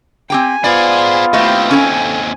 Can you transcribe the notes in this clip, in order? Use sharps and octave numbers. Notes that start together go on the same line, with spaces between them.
C4 G4 G5 G#5
B3 F4 G#4 C5 D5
D#2 A3 C4 E4 G4 B4 D#5
C#4 A4 G5 G#5